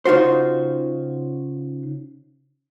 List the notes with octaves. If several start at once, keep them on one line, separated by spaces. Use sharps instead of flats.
C#3 D#4 F4 F#4 C5